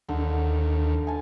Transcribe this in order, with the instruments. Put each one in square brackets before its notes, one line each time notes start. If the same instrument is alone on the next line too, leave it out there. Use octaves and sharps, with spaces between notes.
[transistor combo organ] D#2 [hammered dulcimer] D3
[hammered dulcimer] G#5 A5